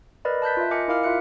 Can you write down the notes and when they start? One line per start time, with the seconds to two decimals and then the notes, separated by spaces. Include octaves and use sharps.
0.25 A#4 B4 D5 D#5 B5
0.42 A5 F#6 G6 B6
0.57 F4 E5
0.71 A#4 D#5 G#5 D6 C#7
0.88 E4 A#4 F5 D6 F6
1.03 F4 E5 F#6 C#7